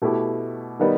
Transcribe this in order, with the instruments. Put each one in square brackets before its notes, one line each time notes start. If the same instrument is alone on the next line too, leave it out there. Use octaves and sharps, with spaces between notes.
[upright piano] B2 A3 E4 G4
D#3 G3 B3 D#4